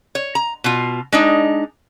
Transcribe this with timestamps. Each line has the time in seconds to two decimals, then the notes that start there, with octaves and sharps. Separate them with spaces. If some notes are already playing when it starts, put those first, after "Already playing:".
0.15 C#5
0.35 A#5
0.64 B2 F4
1.12 G#3 D4 D#4